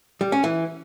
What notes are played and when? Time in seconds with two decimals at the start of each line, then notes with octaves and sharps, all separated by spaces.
0.21 G3
0.32 C#4
0.44 E3